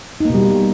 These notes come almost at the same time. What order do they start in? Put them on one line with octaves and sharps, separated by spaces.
D#4 A#3 B2 G3